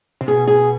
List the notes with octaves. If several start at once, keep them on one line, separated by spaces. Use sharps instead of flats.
C3
B2 G#4
G#4